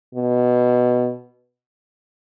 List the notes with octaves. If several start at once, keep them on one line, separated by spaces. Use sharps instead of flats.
B2